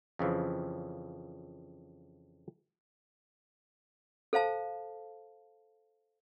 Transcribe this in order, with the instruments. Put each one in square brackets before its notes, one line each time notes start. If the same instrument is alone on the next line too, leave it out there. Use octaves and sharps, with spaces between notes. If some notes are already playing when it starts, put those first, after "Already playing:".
[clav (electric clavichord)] F2 C#3 E3 F3
[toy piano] A4 C5 F5 A5